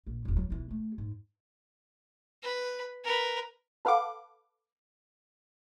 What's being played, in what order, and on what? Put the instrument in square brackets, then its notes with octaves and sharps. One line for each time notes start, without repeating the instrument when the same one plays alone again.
[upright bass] A#1
E1 A1
F#3
B1 E3
A3
G#2
[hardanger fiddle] B4
A#4 B4
[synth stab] A4 B4 F5 F#5 D6